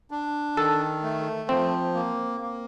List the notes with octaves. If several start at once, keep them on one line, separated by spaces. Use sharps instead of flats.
D4
D#3 A4
A3
F3 C4
A#3
A#3